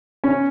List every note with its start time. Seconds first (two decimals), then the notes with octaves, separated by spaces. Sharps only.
0.24 C#4